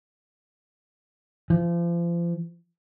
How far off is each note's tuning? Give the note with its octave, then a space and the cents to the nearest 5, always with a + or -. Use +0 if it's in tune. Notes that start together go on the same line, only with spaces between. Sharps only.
F3 -35